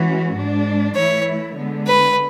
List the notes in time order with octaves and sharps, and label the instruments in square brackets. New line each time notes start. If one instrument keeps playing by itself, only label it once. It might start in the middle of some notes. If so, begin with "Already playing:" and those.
Already playing: [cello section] E3 G#3 C#4 F#4
G#2 G#3 D4
[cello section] E3 A3 E4 [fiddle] C#5
[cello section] D3 G#3 B3
[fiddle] B4